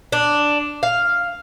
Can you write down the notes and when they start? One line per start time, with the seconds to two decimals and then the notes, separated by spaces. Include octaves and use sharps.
0.12 D4
0.83 F5